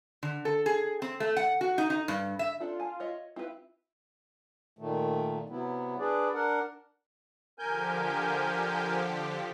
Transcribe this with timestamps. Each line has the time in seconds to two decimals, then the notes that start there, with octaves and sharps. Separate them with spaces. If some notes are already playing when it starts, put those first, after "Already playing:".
0.23 D3
0.45 A4
0.66 G#4
1.02 C4
1.20 A3
1.36 F#5
1.61 F#4
1.78 D#4
1.90 D#4
2.08 G2
2.39 E5
2.60 C4 D4 F4 A4
2.80 G#5 A5
3.00 C#5 D#5 E5
3.36 C4 E4 F4 G4 B4 E5
4.79 A#2 D#3 A3
5.49 C3 F#3 B3 E4
5.99 D4 G#4 B4 D5
6.34 D4 A#4 F#5
7.59 D3 F3 G4 A#4 G#5 G6